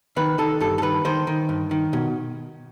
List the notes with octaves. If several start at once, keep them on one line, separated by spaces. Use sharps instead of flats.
D#3 B4
D#3 A4
G2 A4
A4
D#3 B4
D#3 C5
D#3
G2
D#3
B2